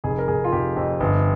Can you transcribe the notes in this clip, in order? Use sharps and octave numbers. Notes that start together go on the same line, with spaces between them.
F1 G#4
A#4
F1 G#4
F4
F1 G4
F2
G1